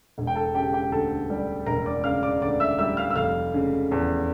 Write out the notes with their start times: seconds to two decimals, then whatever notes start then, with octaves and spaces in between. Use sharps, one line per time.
0.18 E1
0.27 G5
0.36 A4 A5
0.55 C#3 G4 G5
0.73 G4 G5
0.92 D2 A4 A5
1.30 G3
1.66 E1 A#4 A#5
1.86 D5 D6
2.04 C#3 F5 F6
2.23 D5 D6
2.42 D2 D5 D6
2.60 E5 E6
2.78 G3 E5 E6
2.97 F5 F6
3.10 E6
3.16 F1 F5 F6
3.54 C#3
3.92 E2